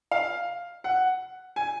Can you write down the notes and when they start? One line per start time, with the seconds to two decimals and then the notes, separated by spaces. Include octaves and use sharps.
0.11 F5
0.84 F#5
1.56 G#5